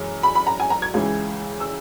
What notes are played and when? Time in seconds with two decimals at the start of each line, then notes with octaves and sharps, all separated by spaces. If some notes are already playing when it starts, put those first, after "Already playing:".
Already playing: F#2 E3 G#3
0.23 B5
0.35 B5
0.47 A#5
0.60 G#5
0.70 A#5
0.82 G#6
0.94 C#2 C#3 E3 G#3
1.60 E6